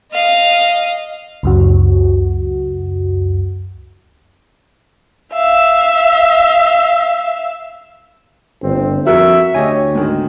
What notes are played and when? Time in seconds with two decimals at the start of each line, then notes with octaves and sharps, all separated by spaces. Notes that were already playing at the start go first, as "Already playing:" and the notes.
0.12 D#5 F5
1.43 C#2 F#2 F#4
5.33 E5 F5
8.63 G1 C4
9.06 F2 F#4 A#4 E5
9.54 D2 G4 C#5 D#5 G#5
9.95 G#2 D#3